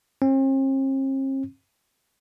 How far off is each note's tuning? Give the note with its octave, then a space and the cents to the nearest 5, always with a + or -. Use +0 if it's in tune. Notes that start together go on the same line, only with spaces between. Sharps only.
C4 +45